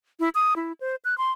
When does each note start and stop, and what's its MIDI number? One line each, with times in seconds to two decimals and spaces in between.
0.20 0.29 64
0.35 0.54 87
0.56 0.73 64
0.81 0.96 72
1.05 1.17 90
1.18 1.32 84